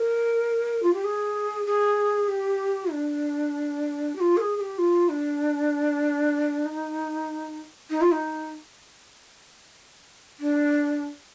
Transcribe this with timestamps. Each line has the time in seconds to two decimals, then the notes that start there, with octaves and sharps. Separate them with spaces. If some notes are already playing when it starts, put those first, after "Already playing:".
Already playing: A#4
0.83 F4
0.94 G4
1.04 G#4
1.66 G#4
2.28 G4
2.91 D4
4.16 G4
4.20 F4
4.37 A#4
4.40 G#4
4.57 G#4
4.61 G4
4.78 F4
5.09 D4
6.66 D#4
7.90 D#4
8.01 F4
8.12 D#4
10.40 D4